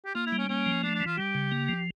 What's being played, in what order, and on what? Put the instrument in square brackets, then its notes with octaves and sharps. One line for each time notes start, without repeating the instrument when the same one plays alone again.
[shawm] G4
[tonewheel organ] A#3 [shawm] F4
[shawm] E4
[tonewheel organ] G3
[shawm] C#4
[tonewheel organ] A#3 [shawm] C#4
[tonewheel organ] F3
[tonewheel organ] A3 [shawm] D4
[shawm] D4
[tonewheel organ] E3
[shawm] F4
[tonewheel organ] G3 [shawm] G4
[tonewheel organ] C#3
A#3
F3